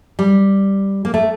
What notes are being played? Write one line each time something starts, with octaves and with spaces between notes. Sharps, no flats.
G3
A#3
A3